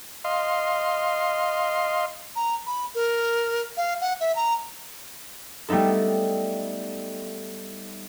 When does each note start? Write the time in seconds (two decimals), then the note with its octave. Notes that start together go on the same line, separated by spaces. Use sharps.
0.24 D#5 F5 C6
2.36 A#5
2.66 B5
2.95 A#4
3.77 F5
4.01 F#5
4.20 E5
4.36 A#5
5.69 G3 A3 B3 D#4 A4